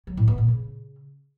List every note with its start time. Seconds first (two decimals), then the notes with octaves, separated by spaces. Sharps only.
0.07 F#3
0.17 A2
0.28 B3
0.38 A#2
0.48 C#3